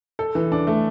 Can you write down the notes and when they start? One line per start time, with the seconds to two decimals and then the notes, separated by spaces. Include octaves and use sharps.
0.19 A4
0.35 E3
0.52 D4
0.67 A3